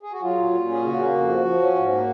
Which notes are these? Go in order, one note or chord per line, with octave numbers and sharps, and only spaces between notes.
G#4
F#4
F#3 F4
A#2
A#2
C#4 G#4
C#3 F#4
A#3
F2
F3
F3
C#4
G#2
A#3